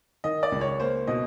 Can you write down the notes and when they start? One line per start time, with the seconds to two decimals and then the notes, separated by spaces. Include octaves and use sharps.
0.24 D#3 D#5
0.43 D5
0.52 C#2
0.61 C#5
0.80 A#3 C5
1.07 B2 D#5